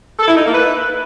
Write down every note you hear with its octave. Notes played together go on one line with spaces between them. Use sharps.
A4
E4
D#4
A#3
B4